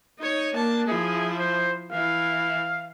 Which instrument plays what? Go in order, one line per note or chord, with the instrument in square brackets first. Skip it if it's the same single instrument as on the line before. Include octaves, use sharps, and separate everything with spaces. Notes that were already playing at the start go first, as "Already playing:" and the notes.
[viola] D#4 C#5
[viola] A#3 A5 [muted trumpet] D4
[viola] F3 E4 [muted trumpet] G#4
[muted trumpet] C5
[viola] E3 E4 [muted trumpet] F5